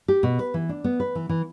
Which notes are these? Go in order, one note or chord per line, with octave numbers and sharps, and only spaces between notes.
G4
B2
B4
E3
D4
B3
B4
E3
E3